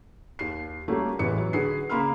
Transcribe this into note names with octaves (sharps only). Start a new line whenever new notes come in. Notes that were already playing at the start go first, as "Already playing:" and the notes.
D#2 C7
G3 A3 A#3 C#4 F#4 G4
A1 E2 E3 B4 C#7
F#3
D3 F#4 G#4 B4 C7
C#3 A#3 B5 C6 F6